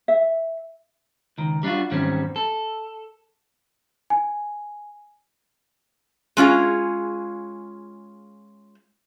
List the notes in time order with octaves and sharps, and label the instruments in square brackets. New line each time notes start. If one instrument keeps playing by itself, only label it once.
[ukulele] E5
[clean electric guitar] C#2 D#3
G3 D4 D#4 F4 F#4
E2 G#2 D#3 G3 C4 C#4
A4
[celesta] G#5
[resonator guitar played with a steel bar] G#3 C#4 F4 G#4